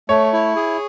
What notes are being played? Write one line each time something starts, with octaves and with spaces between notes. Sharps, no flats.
A3 C#5
E4
G#4